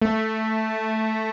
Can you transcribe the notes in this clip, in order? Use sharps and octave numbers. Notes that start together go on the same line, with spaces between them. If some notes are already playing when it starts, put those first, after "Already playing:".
A3